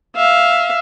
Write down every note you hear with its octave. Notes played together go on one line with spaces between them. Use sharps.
E5 F5